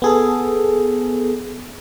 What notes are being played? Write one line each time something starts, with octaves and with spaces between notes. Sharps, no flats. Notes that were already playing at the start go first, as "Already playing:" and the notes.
B3 G#4 A4